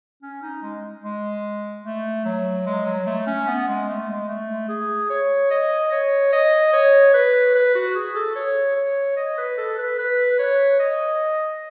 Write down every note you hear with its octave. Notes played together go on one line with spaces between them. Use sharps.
C#4
D#4
G#3
G#3
A3
F#3
G#3
F#3
A3
C#4
B3
G#3
A3
G#3
A3
G#4
C#5
D#5
C#5
D#5
C#5
B4
B4
F#4
G#4
A4
C#5
C#5
D#5
B4
A4
B4
B4
C#5
D#5